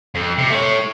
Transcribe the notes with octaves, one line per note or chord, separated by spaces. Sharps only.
F2
C3
A3 C#5